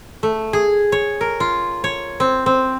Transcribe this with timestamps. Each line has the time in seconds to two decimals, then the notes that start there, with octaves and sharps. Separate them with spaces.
0.23 A3
0.53 G#4
0.92 C#5
1.21 A#4
1.40 F4
1.84 C#5
2.20 C4
2.46 C4